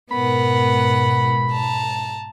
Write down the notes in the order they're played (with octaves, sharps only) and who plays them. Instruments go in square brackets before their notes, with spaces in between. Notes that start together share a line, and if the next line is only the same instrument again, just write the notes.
[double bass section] G#2 B2 [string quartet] B3 A#4 F#5 [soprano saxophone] B5
[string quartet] A5 A#5